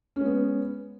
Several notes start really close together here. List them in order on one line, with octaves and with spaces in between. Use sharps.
C#4 G#3 B3